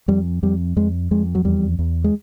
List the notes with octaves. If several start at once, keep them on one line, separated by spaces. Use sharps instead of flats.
F2 G3
F2 G3
F2 G#3
F2 G#3
F#3
E2 G3
E2
G#3